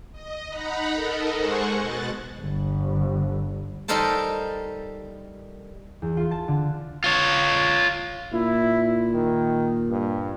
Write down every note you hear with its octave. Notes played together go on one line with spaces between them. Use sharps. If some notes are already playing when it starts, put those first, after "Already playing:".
D#5
D#4 F#5 A#5 B5
A4 A#4 D#5
G#3 G#4 C5 F#5 C#6
B2 F#6 A6
G1
G3 D#4 A4 A#4 C5 A5
E2
F4
A5
D3
F4 C#5
A#2 E4
D#3
G2